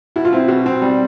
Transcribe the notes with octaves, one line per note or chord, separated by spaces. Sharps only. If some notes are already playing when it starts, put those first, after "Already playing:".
B2 E4
F4
C4 E4
B2
C4
G3